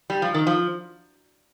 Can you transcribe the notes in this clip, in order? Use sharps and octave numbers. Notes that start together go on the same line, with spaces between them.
G3
F3
D#3
F3